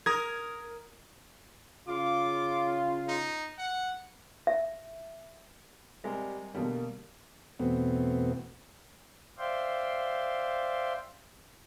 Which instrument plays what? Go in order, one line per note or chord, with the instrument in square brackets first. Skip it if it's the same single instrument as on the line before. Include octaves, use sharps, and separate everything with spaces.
[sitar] A#4 [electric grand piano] D#6 G#6
[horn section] C#3 F4 [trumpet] D6
[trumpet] D#4
F#5
[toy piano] E5
[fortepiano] C3 G#3 A#4 [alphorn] G3
[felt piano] B2 D3 G3 [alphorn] A#3
[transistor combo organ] E2 B2 A3 B3 C4
[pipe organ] C5 D5 E5 F5 G5 C6